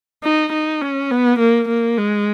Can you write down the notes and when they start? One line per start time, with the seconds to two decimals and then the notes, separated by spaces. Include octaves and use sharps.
0.24 D#4
0.53 D#4
0.82 C#4
1.11 B3
1.40 A#3
1.69 A#3
1.98 G#3